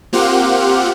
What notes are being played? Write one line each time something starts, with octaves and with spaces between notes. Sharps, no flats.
A#3 C4 F4 G4 F#5